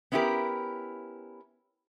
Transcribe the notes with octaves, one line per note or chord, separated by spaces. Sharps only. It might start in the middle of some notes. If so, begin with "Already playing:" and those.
B3 C#4 E4 F#4 G4 A#4